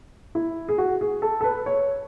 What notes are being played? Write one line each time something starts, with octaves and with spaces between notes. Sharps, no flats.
E4
G#4
F#4
G#4
A4
A4
B4
C#5